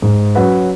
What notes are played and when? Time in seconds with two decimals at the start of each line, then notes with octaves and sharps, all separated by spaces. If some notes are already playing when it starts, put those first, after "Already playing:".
0.02 G#2
0.35 F#3 C#4 F#4 B4